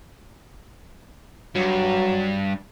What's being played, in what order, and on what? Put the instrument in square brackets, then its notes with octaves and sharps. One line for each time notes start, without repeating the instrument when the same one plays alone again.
[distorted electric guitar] G2 [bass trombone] F#3